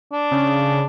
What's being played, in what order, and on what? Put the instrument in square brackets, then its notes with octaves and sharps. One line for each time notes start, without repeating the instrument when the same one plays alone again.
[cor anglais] D4
[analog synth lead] C#3